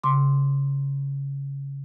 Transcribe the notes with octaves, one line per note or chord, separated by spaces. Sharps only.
C#3 C6 D6